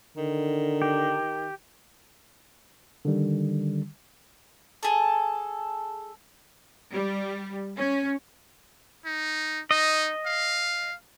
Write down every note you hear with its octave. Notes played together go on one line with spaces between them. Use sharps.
D3 D#3
G4
D3 D#3 G3
G#4 A4
G3
C#4
D#4
D#4 D#5
F5